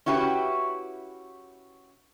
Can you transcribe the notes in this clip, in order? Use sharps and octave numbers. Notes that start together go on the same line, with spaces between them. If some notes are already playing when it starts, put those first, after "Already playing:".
C#4 E4 F#4 G4 B4